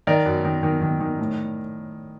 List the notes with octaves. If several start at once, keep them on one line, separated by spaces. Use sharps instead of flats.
D#3 A#4 D5
F#2
D#3
D#3
D#3
D#3
A2